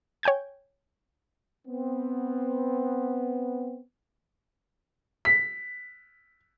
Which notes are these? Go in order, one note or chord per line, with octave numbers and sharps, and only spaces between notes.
C#5 G5 G#5 G6 G#6
B3 C4
B6